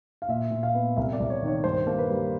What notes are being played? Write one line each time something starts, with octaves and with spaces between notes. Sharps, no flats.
F5
A#2 E5
A#2
F5
B3
C2 E5
D5
C2
C#5
D#3
C#5
G2 C5
A#3
B4
G3